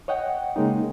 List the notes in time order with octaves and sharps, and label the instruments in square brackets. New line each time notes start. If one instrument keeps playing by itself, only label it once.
[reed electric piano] C#5 D#5 F#5 G5
C#3 G#3 A#3 D#4